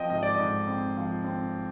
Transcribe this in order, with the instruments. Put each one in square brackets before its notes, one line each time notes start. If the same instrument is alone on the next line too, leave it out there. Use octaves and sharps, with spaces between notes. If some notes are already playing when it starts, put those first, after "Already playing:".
Already playing: [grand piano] F3 C4 D#5 G5
G#2 D#5
D5
G#2 D#5
C4
F3
C4